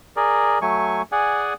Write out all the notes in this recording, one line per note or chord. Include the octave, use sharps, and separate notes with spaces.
G#4 A#4 D5
F#3 A3 G#5 C#6
G#4 D5 F#5 G#5